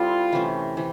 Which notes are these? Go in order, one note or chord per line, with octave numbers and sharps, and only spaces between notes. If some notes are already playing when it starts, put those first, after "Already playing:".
Already playing: G3 C4 E4 F4 A4
C3 E3 A3 C#4
C3 E3